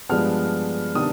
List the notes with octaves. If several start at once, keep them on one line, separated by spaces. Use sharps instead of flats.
G2 F3 G#3 B3 D4 F6
C3 D#3 B3 D4 D#6